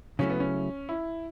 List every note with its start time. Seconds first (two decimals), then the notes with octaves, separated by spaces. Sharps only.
0.19 C#3 F#3 A3 C#4 E4
0.30 B3
0.40 C#4
0.89 E4